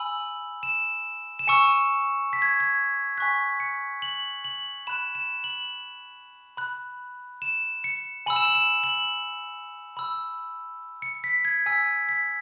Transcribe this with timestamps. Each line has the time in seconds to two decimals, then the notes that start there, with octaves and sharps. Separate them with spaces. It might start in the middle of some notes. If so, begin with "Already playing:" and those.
Already playing: G#5 B5 E6 F#7
0.63 E7
1.39 E7
1.47 G#5 C#6 E6 C#7
2.33 B6
2.42 G#6
2.60 G#6
3.17 G#5 C#6 F#6 B6
3.60 C#7
4.02 F#7
4.45 F#7
4.87 B5 F#6 E7
5.15 E7
5.44 F#7
6.57 B5 F#6
7.42 E7
7.84 C#7
8.26 G#5 B5 E6 F#7
8.36 E7
8.45 F#7
8.55 E7
8.84 F#7
9.97 B5 E6
11.02 C#7
11.24 B6
11.45 G#6
11.66 G#5 E6 B6
12.09 B6